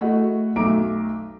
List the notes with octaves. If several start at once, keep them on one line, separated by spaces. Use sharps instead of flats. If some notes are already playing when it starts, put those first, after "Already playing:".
A3 E4 F#4 G#4 D#5 F#5
B1 A3 E5 A#5 D6 D7